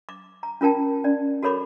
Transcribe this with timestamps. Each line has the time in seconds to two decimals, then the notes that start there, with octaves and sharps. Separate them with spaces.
0.09 D6
0.43 A#5
0.61 C#4 F4 A#4 G5 A5
1.04 C#4 D5
1.43 F#4 A4 A#4 C#5 B5 D6